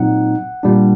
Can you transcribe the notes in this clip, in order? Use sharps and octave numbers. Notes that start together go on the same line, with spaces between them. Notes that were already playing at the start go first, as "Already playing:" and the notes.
Already playing: A#2 F#3 C4 D#4 F#5
A#2 G3 D4